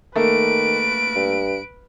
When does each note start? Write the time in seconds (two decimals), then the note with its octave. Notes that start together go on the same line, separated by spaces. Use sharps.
0.16 D#3 A3 A#3 B4 D7
1.15 G2